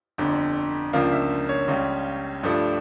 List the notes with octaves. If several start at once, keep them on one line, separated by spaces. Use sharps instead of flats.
G1 F2 D3
C#2 C#3 F3 A#3 D4 F5
E5
C#5
C#2 C#3 G3
G2 F3 A3 D4